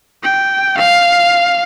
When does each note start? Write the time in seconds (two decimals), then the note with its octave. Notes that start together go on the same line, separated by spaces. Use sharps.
0.23 G5
0.78 F5